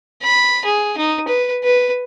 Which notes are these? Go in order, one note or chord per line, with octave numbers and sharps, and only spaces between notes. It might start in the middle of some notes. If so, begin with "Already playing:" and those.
B5
G#4
D#4
B4
B4